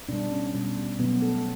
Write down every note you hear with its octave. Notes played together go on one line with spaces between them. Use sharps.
B2 G3 D4
C#4
B2 G3
B2 F#3 A3 B3
A4